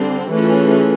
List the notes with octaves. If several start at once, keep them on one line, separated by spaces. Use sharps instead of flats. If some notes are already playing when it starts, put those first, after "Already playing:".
Already playing: D3 G3 C4
E3 A3 C#4 F4 G#4